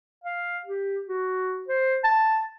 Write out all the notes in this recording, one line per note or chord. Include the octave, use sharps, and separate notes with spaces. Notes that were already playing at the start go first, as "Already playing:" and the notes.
F5
G4
F#4
C5
A5